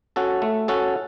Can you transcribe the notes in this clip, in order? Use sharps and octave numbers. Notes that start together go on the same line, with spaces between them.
C#4 F#4 A4
A3
C#4 F#4 A4